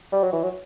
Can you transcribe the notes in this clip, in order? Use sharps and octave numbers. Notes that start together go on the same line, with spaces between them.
G3
F#3
E3
F#3